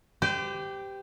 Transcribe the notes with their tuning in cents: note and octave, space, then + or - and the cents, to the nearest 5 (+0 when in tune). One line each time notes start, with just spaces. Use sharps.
G4 +0 C5 -40